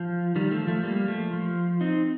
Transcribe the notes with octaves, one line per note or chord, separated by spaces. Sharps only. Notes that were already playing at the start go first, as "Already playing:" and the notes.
Already playing: F3
D#3 G3
F3 A3
F3 A3
G3 A#3
F3 A3
F3
C4 D#4